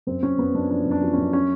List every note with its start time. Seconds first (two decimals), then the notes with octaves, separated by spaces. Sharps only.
0.07 F#2 C4
0.22 F#2 C#4
0.39 F#2 B3
0.55 F#2 D4
0.70 F3 D4
0.86 F#2
0.91 D4
1.02 F3
1.13 F#2 C#4
1.33 C#4